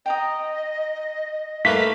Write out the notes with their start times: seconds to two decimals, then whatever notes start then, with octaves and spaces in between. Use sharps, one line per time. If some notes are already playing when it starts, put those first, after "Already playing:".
0.06 D#5 G5 A#5 D#6
1.65 A3 A#3 B4 B6